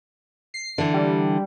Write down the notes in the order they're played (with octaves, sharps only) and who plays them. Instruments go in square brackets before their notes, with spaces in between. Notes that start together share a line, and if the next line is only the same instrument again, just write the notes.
[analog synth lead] C7
[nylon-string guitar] D3 E3
[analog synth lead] G3